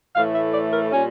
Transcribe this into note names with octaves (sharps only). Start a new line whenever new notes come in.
A2 E3 A3 F5
E5
D5
A#4
A#2 G3 C#4